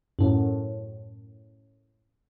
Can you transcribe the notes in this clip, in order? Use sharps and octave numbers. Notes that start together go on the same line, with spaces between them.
F#2 A2